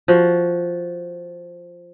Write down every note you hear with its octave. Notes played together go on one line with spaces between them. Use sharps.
F3 F#4